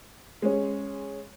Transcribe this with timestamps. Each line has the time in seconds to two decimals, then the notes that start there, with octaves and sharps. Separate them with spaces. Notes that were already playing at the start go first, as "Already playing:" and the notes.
0.42 G#3 C#4